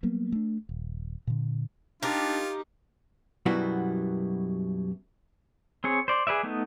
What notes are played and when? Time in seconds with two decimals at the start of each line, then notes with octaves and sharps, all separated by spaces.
0.03 F#3 G3 A#3 B3
0.32 A3 D4
0.69 D#1
1.27 A#2 D3
2.03 D4 D#4 F4 G4 A#4
3.46 F#2 B2 G3 B3 E4 F#4
5.84 C4 G#4 C#5
6.08 C5 D5
6.27 G#4 B4 D5 E5
6.43 A3 B3 D#4